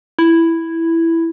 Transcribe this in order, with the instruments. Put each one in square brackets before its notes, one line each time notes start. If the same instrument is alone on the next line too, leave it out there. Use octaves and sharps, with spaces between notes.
[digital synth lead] E4